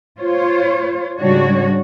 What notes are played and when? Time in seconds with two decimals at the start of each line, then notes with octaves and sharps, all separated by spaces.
0.19 F4 C5 C#5
1.18 G#2 C#3 G3 D4 F#4 C#5